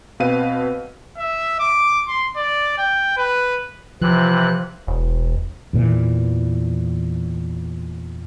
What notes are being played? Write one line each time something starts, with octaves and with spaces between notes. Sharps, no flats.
B2 C4 B4 F5 D#7
E5
D6
C6
D5
G5
B4
C3 E3 F3 F#6
E1
E2 A#2 E3